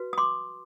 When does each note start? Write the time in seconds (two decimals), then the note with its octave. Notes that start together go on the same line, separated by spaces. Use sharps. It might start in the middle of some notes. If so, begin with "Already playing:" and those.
Already playing: F#4 B4
0.13 D#6
0.18 C6 D6